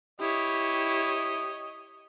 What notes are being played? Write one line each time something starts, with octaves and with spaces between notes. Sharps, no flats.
E4 G4 C#5 D#5